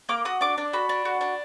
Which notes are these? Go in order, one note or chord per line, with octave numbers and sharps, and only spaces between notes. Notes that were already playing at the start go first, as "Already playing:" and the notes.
A#3 D6
F#4 D#6
D4 D6
D4
F#4 B5
D4
F#4
D4